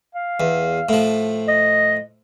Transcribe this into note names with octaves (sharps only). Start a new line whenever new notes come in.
F5
E2
A2 F3
D#5